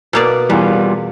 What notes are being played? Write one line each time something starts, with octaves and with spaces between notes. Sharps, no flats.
B2 A#3 D5
E2 G3 B3 F4